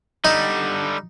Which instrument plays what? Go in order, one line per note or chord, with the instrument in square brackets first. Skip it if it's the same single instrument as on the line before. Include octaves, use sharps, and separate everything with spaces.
[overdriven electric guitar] D3 G3 [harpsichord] D#4